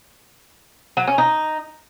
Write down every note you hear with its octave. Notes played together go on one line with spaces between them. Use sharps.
F#3
C#4
D#4